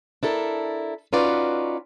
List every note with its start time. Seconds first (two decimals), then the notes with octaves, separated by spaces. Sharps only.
0.23 D4 E4 A4 A#4
1.13 C#4 D#4 F4 F#4 B4 D5